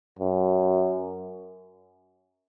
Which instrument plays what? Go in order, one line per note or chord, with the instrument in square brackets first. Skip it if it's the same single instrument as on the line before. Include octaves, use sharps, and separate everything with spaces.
[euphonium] F#2